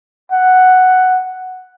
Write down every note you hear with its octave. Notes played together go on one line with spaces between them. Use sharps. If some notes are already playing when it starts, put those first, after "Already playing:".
F#5